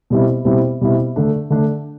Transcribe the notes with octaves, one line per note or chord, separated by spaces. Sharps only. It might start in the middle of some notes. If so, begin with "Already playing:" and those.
B2 G3 C4 E4
B2 G3 C4 E4
B2 G3 C4 E4
D3 A3 D4
D3 A3 D4